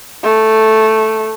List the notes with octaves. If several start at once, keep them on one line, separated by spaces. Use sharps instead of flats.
A3